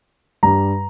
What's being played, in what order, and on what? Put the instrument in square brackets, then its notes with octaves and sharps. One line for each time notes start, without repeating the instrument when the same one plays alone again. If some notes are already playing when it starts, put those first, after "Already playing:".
[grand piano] G2 G3 A#5